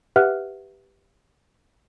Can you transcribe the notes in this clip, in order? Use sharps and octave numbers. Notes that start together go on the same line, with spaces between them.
G4 B4 E5 F#5 F6 F#6